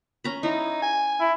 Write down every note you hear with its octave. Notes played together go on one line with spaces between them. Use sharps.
C#4 A#5 B5
D#4 E4
G#5
E4